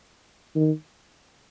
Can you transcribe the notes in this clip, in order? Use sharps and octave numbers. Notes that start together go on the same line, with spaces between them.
D#3